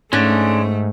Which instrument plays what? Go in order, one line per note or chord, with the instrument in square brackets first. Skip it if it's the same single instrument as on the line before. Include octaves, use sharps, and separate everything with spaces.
[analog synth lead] G#2 [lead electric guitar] G#3 D4 [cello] A3 [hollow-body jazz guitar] C#4